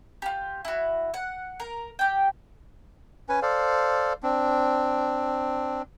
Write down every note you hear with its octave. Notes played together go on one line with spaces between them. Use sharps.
F4 G4
E4 F#4
F#5
A#4
G4 G5
C#4 B4 G#5
A4 C5 D5 F5
C4 D4